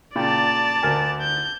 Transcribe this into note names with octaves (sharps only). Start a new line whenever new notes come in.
A#2 C#3 D5 G5 A5
D2 A#4 G#5
G6